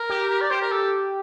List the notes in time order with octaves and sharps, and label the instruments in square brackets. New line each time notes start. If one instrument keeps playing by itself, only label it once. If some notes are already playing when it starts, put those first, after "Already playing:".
Already playing: [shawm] A#4
[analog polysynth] G4
G4
[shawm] D5
[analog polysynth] G4 [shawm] C5
[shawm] A#4
A4